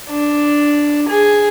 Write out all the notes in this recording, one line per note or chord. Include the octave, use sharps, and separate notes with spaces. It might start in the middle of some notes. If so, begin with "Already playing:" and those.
D4
G#4